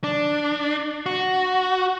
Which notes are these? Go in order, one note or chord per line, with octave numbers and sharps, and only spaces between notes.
D4
F#4